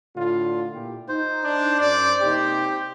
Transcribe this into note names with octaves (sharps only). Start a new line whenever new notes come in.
A2 D3 F4
A#2 E4 G4
D#4 C5
D4
F#2 D5
C3 A#3 D#4 G4